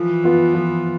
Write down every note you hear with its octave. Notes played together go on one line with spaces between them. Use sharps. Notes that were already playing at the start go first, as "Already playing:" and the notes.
Already playing: E3 F3
B3 F4
F3